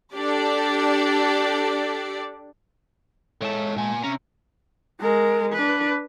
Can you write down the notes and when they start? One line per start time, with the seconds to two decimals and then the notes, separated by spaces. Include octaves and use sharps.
0.16 D4 G4 A4 D5
3.42 G#3 A4 C#5 A5
3.76 A#2 G#5
4.03 C3 C#4 A#5
5.01 G#3 A#4
5.53 D4 B4